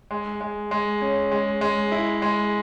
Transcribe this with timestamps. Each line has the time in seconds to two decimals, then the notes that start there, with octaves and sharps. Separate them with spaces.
0.11 G#3
0.41 G#3
0.71 G#3
1.02 C#4
1.32 G#3
1.61 G#3
1.92 E4
2.22 G#3